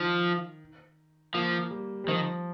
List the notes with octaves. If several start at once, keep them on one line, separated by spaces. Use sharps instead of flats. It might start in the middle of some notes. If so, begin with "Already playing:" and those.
Already playing: D#3 F3
F3 A#3
G3
G3
D#3 F3